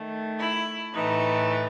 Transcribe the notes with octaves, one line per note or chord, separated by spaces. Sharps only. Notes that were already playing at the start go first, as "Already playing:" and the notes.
Already playing: D#3 A3
E4
A2 E3 A3 D#4